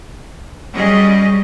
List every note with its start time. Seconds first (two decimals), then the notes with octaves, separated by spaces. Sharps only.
0.74 F#3 G3 C#4 G#4 D#5